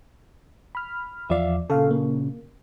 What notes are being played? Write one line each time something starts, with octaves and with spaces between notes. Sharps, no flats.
B5 F6
E2 F3 D5 E5 F5
A#2 C#3 A4 F5
A#3